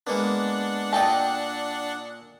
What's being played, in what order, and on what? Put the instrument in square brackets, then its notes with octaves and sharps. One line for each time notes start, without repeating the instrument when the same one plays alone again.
[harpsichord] G#3 A#3 B3 [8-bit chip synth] D4 F#5
[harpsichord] A#2 A4 D#5 [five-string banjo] G5 A5